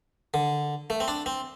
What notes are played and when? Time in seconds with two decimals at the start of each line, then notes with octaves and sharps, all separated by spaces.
0.34 D3
0.90 A3
1.00 C4
1.08 D4
1.26 C4